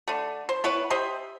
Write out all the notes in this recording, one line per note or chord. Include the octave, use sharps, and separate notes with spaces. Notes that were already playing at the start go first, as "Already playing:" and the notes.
D3 A3
C5
B3 E4 B4 C#5
G4 C5 D#5 E5